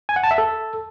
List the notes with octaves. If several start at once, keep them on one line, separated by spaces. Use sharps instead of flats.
G#5
F#5
A5
E5
A4